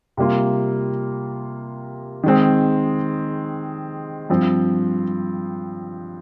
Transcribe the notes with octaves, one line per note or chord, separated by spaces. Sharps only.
C3 G3 A#3 F4
D#3 G#3 C4
G2 F3 C4